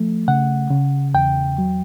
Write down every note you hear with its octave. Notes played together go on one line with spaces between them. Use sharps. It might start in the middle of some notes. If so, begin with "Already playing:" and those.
Already playing: F3 A3
C#3 F#5
C#3
E2 G5
F#3